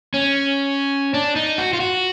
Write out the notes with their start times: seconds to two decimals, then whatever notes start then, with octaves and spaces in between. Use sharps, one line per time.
0.14 C#4
1.14 D4
1.36 D#4
1.58 F#4
1.73 F4
1.80 F#4